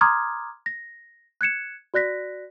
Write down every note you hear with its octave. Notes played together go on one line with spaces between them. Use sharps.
A#5 C6 D6 D#6 F6 G#6
A#6
F#6 G#6 C#7 E7
F#4 D5 F#6 A#6 B6